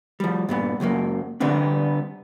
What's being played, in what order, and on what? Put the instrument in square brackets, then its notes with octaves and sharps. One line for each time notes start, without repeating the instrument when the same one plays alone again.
[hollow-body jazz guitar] F3 G3
G2 A#2 B3
C#2 F#2 F#3 A#3
D3 G3 B3 C4 D4